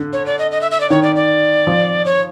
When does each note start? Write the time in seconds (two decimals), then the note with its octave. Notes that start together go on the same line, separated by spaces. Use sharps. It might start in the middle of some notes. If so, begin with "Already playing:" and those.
Already playing: D3
0.13 C#5
0.26 D5
0.39 D#5
0.51 D#5
0.61 E5
0.71 E5
0.80 D5
0.90 D#3 C#5
1.03 D5
1.15 D5
1.67 F3
2.05 C#5